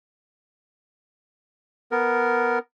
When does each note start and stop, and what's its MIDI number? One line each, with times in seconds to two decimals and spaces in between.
1.92 2.59 59
1.92 2.59 70